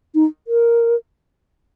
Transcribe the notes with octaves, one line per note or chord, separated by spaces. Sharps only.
D#4
A#4